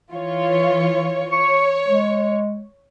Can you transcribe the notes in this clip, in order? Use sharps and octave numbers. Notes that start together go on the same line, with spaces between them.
E3 F4 C#5
C#5 C#6
G#3